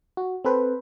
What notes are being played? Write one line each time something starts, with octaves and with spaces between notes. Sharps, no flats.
F#4
C4 A4 B4 C5